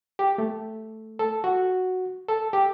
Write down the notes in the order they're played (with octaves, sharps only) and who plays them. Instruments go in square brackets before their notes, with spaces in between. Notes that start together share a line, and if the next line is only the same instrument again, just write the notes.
[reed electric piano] G4
A3
A4
F#4
A4
G4